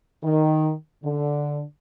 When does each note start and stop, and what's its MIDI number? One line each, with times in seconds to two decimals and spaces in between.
0.23 0.72 51
1.04 1.62 50